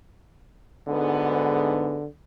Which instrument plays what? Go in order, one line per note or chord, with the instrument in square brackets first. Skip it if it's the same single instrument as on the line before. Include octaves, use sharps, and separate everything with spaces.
[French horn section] D2 G#2 B3 [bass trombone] D3